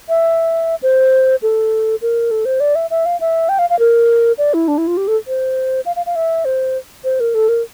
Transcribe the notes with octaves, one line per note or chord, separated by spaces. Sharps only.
E5
C5
A4
A#4
A4
C5
D5
E5
E5
F5
E5
G5
F5
F5
A#4
D5
E4
D4
E4
F4
G4
A4
C5
F5
F5
F5
E5
C5
C5
A#4
A4
A#4